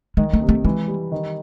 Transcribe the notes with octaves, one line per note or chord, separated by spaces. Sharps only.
D#3 G#3
A3
C3
A3
E3 G#3
G3
D#3